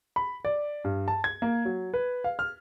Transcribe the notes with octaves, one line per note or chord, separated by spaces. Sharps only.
B5
D5
G2
A5
G#6
A#3
F#3
B4
F5
F6